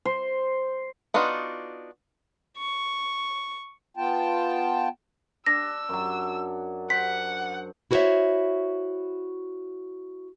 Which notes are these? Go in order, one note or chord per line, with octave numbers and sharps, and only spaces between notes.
C5
B3 D4 D#4 F4 F#4
C#6
B3 F4 G5 A5
D4 E6 A#6
F#2 F#3
C5 F#5 B6
E4 F#4 A#4 C5 C#5 E5